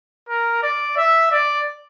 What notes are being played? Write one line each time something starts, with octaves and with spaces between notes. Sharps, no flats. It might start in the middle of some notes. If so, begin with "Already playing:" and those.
A#4
D5
E5
D5